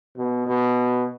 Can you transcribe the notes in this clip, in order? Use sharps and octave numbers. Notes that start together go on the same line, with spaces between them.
B2
B2